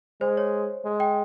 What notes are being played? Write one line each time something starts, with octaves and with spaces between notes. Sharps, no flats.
G#3 C5
C#5
G#3
G5